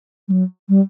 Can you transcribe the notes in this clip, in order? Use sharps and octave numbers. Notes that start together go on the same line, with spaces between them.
G3
F#3
G3